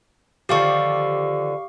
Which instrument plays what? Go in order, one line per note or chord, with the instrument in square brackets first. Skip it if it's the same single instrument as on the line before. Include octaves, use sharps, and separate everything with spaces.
[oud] D3 D#3 F3 [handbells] G4 F5 C#6